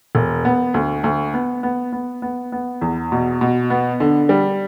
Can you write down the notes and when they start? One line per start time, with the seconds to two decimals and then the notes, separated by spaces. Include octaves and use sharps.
0.15 E1
0.45 B3
0.74 D2
1.04 D2
1.34 B3
1.63 B3
1.92 B3
2.22 B3
2.52 B3
2.81 E2
3.12 B2
3.41 B2
3.70 B3
4.00 D3
4.29 G3